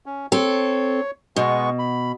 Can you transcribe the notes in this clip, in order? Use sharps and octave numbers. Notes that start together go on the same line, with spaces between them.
C#4
C4 A4 C#5
B2 G#3 B3 C#6
B5